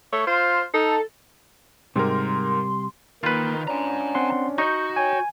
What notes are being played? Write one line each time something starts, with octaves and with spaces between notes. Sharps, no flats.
A3 C#5
F4 C5
D#4 A4
G#2 C3 G3 A#4 C6
D#3 A#3 F4 B4
C#4 D4 G#5 A#5
C4 F#5 C6
D#4 F#4 C#6 G6
C#5 G5 G#5